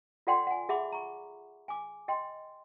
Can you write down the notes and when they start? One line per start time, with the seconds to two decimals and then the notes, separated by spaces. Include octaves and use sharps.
0.27 F4 A4 D5 F#5 G5 C6
0.47 F#5 G#5
0.69 G#4 E5 F#5 B5 D6
0.92 A#5 C#6
1.68 G#5 D6
2.08 D#5 G5 C6